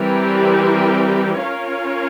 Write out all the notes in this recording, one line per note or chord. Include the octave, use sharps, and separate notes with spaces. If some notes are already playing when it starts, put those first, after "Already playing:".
Already playing: E3 G3 C4 G4 A#4
C#4 F4 A#4 C#5 F5